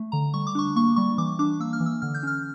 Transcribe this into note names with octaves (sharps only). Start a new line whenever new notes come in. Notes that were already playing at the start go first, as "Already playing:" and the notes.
Already playing: A3
D3 A#5
G3 C#6
D6
D4 C#6
A#3 C#6
G3 C#6
E3 D6
D4 D6
A#3 E6
F6
E3
E6
D3 F6
G6
C#4 F6